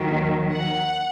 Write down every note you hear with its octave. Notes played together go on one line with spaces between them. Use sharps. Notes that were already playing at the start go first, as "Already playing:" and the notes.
Already playing: D#2 D#3 F#3
F#5